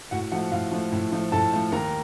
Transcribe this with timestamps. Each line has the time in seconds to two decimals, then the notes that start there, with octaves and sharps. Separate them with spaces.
0.11 A2 F#4 F#5
0.32 F3 A3 F#4 F#5
0.52 A2 F4 F5
0.72 F3 A3
0.92 A2
1.12 F3 A3
1.32 A2 A4 A5
1.53 F3 A3
1.72 D#2 A#4 A#5